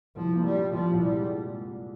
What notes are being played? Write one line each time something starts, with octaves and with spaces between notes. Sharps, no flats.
C2 F3
A#3
G3
A#2
A#2 F3
C2
G3
G#3